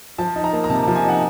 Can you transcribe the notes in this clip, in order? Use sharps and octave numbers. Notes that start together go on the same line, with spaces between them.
F3 A5
D#4
A#5
A#3
A#5
C3 A5
A5
F3
G#5
D#4
F#5